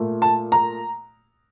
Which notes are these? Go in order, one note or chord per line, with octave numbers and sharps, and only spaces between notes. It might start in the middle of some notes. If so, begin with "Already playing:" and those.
Already playing: A#2 A3
A5
A#5